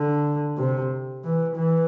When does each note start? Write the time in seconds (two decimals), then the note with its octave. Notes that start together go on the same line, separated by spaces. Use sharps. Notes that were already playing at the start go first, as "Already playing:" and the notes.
Already playing: D3
0.58 C3
1.24 E3
1.56 E3